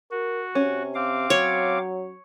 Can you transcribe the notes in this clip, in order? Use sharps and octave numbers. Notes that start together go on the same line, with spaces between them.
F#4 A#4
C3 C#4
C4 F5 D6
F#3 C#5